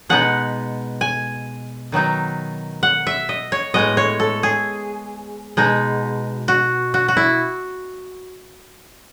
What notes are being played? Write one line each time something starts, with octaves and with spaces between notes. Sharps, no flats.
B2 G#3 B3 D#4 F#5
G#5
D#3 F#3 B3 D#4
F#5
E5
D#5
C#5
A2 G#3 B3 D#5
C#5
A4
G#4
B2 G#3 D#4
F#4
F#4
F#4
E4